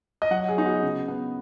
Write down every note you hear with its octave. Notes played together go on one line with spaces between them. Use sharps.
D#5
F#3 F#5
G#4
B3 D#4
F#4
C#3
B3